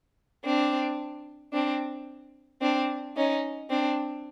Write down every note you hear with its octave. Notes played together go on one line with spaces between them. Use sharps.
C4 D4
C4 D4
C4 D4
C#4 D#4
C4 D4